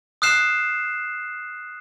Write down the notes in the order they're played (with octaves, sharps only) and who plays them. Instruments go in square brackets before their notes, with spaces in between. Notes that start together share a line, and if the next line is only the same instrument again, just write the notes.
[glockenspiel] D#6 F6 F#6 C7 E7